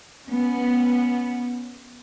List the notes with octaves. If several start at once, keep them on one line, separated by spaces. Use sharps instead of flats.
B3 C#4